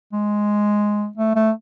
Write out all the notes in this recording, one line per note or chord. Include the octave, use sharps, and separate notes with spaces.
G#3
A3
A3